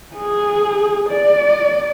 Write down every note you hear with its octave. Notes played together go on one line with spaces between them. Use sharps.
G#4
D5